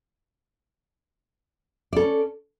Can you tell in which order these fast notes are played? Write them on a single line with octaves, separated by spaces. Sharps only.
D5 A4 C#4